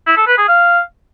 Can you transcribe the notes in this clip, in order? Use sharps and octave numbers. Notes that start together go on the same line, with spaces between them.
E4
A4
B4
G#4
F5